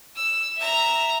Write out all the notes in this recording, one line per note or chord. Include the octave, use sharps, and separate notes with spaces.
E6
E5 A#5